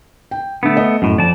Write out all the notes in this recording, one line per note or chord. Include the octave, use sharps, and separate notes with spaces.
G5
D3 A3 B3
D#5
F#2 A2
F2 D5 A5